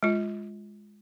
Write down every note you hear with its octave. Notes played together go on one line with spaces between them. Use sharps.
G#3 F4